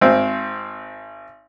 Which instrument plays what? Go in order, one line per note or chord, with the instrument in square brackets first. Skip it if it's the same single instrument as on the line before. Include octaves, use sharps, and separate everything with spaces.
[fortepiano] G#1 C4